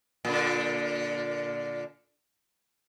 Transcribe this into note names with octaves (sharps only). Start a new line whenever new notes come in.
A#2 D3